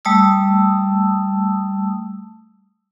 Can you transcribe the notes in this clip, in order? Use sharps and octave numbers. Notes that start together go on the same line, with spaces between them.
G3 A3 A5 D#6 E6